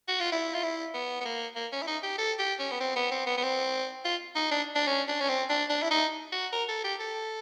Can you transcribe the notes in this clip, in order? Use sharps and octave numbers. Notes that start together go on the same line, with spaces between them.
F#4
F4
E4
F4
E4
B3
B3
A#3
A#3
C#4
E4
D#4
G4
A4
G4
C#4
B3
C4
B3
C4
B3
B3
C4
F4
D#4
D4
D4
C#4
D4
C#4
C4
D4
D4
E4
D#4
F#4
A#4
A4
G4
A4